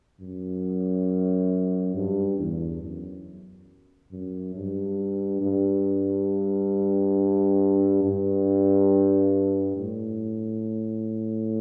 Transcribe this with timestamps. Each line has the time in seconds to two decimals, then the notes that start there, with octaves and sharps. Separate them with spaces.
0.21 F#2
1.95 G2
2.38 E2
2.82 F#2
4.12 F#2
4.56 G2
5.42 G2
8.03 G2
9.77 A2